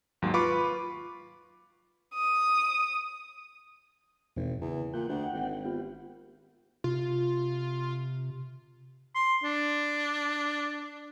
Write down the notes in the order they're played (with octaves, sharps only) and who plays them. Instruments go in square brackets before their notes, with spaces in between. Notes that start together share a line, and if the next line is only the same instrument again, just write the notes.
[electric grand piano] D#2 G#2 F#3
F4 B4 B5 C#6 D6
[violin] D#6
[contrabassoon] G#1 [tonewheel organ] E2 B2 E3
[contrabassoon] E2 [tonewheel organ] C#3
[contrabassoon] A#2 [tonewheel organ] F#5 G5
[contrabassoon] D2
G#1
[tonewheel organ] B3 F4 G4
[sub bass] C3 [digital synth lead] F4
[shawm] C6
D4